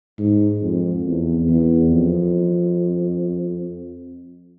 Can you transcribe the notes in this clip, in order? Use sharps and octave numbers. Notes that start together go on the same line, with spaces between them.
G#2
F2
E2
E2
F2